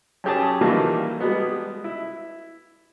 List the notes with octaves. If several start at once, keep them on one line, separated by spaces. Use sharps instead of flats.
F#2 C#4 G4 G#4 A5
A#2 D#3 E3 G3 A3 A#3
G3 G#3 B3
E4